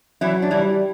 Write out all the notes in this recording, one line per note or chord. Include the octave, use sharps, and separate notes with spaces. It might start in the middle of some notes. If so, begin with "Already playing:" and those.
E3 F#3 E4
D4
E3 G3 E4